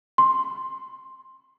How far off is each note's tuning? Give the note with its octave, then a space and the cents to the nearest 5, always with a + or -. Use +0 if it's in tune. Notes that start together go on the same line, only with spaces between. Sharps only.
C6 +5